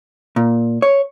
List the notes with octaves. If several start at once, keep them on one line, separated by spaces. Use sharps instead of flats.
A#2
C#5